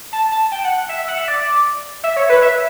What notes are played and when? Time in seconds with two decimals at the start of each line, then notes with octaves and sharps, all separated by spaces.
0.13 A5
0.32 A5
0.52 G5
0.64 F#5
0.89 E5
1.08 F#5
1.18 E5
1.28 D5
2.04 E5
2.16 C#5
2.29 B4
2.42 E5